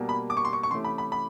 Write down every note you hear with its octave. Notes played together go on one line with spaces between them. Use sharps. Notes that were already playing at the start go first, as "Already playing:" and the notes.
Already playing: B2 G3 A#3
B5
D6
C#6
C6
C#6
C#6
C3 E3 A3 C#4 C6
B5
B5
B5